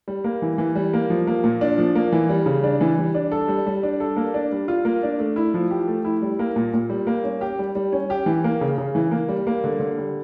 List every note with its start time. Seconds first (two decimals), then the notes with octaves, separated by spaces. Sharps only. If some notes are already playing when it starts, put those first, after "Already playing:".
0.08 G3
0.24 A#3
0.42 E3
0.58 E3
0.75 G3
0.94 A#3
1.10 F3
1.27 A#3
1.44 A#2
1.61 D4
1.78 F3
1.95 A#3
2.12 E3
2.29 G3
2.46 C#3
2.64 D4
2.81 E3
2.98 G3
3.15 D4
3.32 A4
3.48 G3
3.67 G3
3.83 D4
4.00 A4
4.17 A#3
4.34 D4
4.52 G3
4.68 F4
4.85 A#3
5.03 D4
5.19 A3
5.36 E4
5.54 F3
5.71 G4
5.88 A3
6.05 E4
6.22 G3
6.39 A#3
6.56 A#2
6.74 A#2
6.90 G3
7.07 A#3
7.24 C#4
7.41 G4
7.59 G3
7.75 G3
7.92 C#4
8.10 G4
8.26 E3
8.44 A#3
8.61 C#3
8.78 C#3
8.95 E3
9.11 A#3
9.29 G3
9.47 A#3
9.64 D3
9.80 D3
9.97 G3